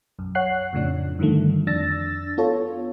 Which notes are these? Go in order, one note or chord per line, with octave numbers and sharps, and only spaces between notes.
B1 F#2
C#5 F#5 F#6 C7
F2 A2 C#3 F3 D4
G2 D3 D#3 F3 A3
F2 D4 E6 A6 A#6
B3 F4 A4 C#5